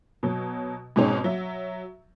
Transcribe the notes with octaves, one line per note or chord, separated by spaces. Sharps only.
B2 F#3
G#2 B2 G#3 C4 C#4 D#4
F#3 E5